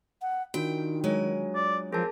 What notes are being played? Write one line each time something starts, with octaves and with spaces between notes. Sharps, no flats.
F#5
D#3 D4 F4 F#4 G5
F#3 G#3 G#5
D5
F3 C4 G#4 A#4 A5